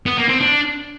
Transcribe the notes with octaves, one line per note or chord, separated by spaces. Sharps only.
B3
A#3
C4
D4